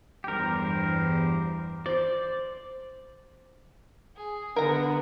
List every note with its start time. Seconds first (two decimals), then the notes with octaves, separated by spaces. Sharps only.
0.24 E2 G2 G4 A#4 C5
1.86 C5 D5
4.17 G#4
4.56 D3 G#3 B3 A#4 A#5